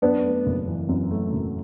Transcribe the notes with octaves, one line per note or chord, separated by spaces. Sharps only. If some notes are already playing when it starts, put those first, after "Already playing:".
F#2 B3 D4
A3
F#1
E3
F#2
A3
F#1